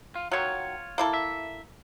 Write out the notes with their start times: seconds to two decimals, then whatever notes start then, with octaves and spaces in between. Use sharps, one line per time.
0.15 F4
0.32 D#3 F#3 F4 C#5
0.98 A#3 E4 A4
1.14 E5